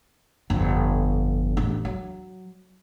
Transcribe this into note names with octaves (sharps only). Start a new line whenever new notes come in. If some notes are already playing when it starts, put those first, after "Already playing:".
G1 F2
A1 D4
F#3